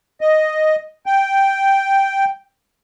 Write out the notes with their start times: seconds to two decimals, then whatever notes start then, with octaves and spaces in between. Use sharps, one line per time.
0.21 D#5
1.06 G5